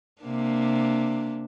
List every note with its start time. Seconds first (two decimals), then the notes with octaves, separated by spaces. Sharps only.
0.22 C3 A#3 D4